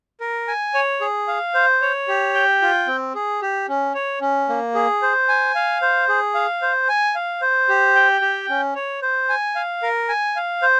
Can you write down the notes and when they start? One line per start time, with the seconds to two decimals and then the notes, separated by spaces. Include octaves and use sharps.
0.20 A#4
0.48 G#5
0.74 C#5
1.01 G#4
1.28 F5
1.54 C5
1.82 C#5
2.08 G4
2.34 G5
2.62 F4
2.87 C4
3.15 G#4
3.42 G4
3.68 C#4
3.95 C#5
4.21 C#4
4.49 A#3
4.75 G#4
5.02 C5
5.28 G#5
5.55 F5
5.82 C5
6.09 G#4
6.35 F5
6.62 C5
6.89 G#5
7.15 F5
7.41 C5
7.69 G4
7.95 G5
8.22 G4
8.49 C#4
8.75 C#5
9.02 C5
9.29 G#5
9.56 F5
9.82 A#4
10.09 G#5
10.36 F5
10.62 C5